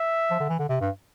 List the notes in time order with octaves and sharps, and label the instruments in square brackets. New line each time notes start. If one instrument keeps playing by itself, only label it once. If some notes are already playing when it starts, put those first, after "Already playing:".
Already playing: [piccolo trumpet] E5
[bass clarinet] F3
D3
E3
D3
C3
G2